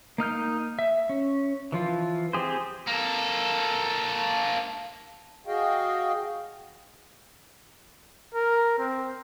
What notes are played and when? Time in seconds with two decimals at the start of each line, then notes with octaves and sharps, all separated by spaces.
0.18 A#3 D#4 F6 G6
0.79 E5
1.09 C#4
1.72 E3 F3 F4
2.33 C4 G4 G#4 C5
2.88 A#3 A4
5.47 F#4 G#4 D#5 F5 G5
8.34 A#4
8.78 C4